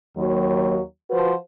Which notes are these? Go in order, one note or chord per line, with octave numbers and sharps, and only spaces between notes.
D#2 F#3
F3 F#4 B4 C5